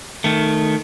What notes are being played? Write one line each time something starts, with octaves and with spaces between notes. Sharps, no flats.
D#3 A3